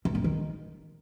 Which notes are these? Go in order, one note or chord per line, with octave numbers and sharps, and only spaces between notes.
G2
A#2
D#3